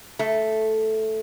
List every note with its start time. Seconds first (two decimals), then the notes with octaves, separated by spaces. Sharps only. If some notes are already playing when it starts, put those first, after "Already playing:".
0.19 A3